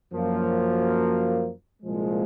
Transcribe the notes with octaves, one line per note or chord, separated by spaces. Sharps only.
F#2 F3 A#3
C2 A#2 F3 G#3